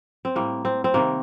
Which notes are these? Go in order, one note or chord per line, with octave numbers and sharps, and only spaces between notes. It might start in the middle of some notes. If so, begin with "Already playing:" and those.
C4
A2 G3 A#3
C4
C4
C3 D#3 G3 A#3